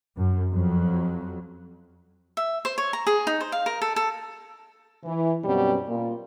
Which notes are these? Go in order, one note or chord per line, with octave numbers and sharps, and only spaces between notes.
F#2
F2 F#3
E5
C5
C#5
A#5
G#4
D#4
C5
F5
A#4
A4
A4
E3
F#2 B2 G3 C4 C#5
A#2